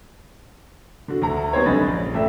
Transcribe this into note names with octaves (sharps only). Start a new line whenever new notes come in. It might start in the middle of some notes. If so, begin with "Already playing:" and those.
D3 F#4
D2 A3 A#5
G3 B3 C4 D#4 C5 C#5
B1 D3 C#4 D#5 B5 A6
A#1
G#1 A3 E5